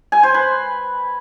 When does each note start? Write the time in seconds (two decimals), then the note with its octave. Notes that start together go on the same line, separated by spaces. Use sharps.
0.12 G#5
0.23 C5
0.34 B4